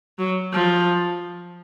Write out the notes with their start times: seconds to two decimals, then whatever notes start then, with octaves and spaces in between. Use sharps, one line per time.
0.18 F#3
0.53 F3